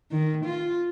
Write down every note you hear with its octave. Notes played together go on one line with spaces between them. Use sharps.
D#3
F4